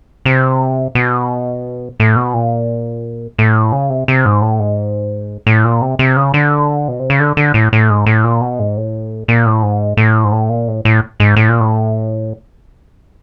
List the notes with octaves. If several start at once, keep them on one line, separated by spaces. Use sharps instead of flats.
C3
B2
A2
B2
A#2
A2
C#3
C3
C3
G#2
A2
G#2
A2
A#2
C3
C3
C#3
D3
B2
C3
C#3
D3
D3
A2
A2
G#2
A2
A#2
B2
G#2
A2
A#2
A2
G#2
A2
G#2
A2
A#2
A2
A2
G#2
A2
A#2
A2